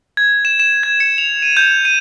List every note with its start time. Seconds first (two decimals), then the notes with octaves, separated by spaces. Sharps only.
0.17 G#6
0.45 E7
0.60 E7
0.83 G#6
1.00 C#7
1.18 F7
1.42 D#7
1.57 G6
1.85 D#7